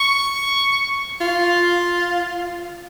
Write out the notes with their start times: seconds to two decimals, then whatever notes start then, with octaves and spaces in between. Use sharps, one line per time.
0.01 C#6
1.21 F4